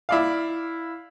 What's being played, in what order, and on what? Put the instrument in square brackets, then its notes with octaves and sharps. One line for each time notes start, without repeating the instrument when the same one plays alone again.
[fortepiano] E4 D5 F5